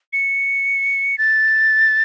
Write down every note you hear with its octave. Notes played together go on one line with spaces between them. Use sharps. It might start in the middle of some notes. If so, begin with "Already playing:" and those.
C#7
A6